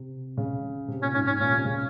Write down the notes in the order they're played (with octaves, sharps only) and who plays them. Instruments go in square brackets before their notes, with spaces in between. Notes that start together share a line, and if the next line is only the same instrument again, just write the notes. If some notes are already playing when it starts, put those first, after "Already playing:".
Already playing: [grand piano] C3
C#3
C3
[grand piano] A#2 [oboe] C#4
[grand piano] G#2 [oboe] C#4
[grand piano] G#2 [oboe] C#4
[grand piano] A#2 [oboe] C#4
[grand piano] C3
C#3